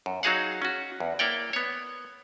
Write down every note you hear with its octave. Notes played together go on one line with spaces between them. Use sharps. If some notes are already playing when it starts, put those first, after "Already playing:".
F#2
F#3 D#4 F#4 G#4 F5 F#5
C#4 F#4
E2
A#3 E4 C#5 D5 G5
B3 C#5